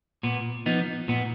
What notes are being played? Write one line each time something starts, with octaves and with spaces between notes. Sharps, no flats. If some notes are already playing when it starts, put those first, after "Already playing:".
A#2 B3
F3 B3 D#4
A#2 B3